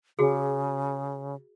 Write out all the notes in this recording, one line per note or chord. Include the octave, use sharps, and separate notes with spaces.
C#3 F#4 G#4